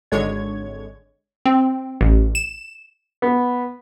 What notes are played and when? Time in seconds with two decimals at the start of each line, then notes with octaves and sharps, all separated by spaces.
0.12 G#1 D3 G#3 C#5 G#6
1.46 C4
2.01 A1
2.35 E7
3.22 B3